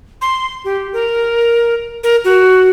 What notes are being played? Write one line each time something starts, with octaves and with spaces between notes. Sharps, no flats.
C6
G4
A#4
A#4
F#4